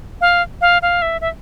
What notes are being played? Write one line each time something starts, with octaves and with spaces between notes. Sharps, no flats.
F5
F5
F5
E5
E5